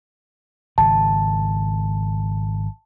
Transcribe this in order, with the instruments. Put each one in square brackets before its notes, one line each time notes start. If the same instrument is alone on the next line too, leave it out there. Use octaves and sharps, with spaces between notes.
[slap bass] G#1 C#3 [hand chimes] A5